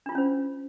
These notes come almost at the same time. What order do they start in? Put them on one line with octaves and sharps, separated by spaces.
D4 F4 E4 C#4 C5